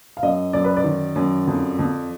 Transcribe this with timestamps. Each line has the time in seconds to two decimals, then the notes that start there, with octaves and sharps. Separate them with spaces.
0.17 F5
0.23 F#2 D#5
0.53 F#2 D5
0.64 B4
0.77 D5
0.84 D#3
1.16 F#2
1.47 F2
1.79 F2